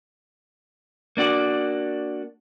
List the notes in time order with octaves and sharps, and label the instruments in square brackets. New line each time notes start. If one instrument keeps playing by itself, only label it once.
[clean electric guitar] A#3 D4 F#4 D5